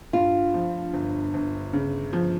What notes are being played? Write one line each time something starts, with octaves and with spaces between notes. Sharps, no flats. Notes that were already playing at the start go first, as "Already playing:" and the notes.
G2 F4
F3
G1
G1
C#3
F3